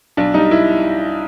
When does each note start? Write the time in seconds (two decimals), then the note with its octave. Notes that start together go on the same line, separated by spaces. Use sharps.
0.17 B1 D4
0.34 G3 D#4
0.51 E4